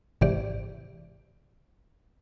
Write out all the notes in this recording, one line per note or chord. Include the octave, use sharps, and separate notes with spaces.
G#1 G#2 C3 E3 G4 D5